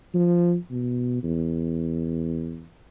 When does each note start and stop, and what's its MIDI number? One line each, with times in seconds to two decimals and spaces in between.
0.14 0.57 53
0.71 1.20 47
1.23 2.66 40